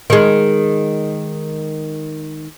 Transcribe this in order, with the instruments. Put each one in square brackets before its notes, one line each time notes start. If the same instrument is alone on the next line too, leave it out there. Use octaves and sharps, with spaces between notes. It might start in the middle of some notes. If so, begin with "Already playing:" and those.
[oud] D#3 G#3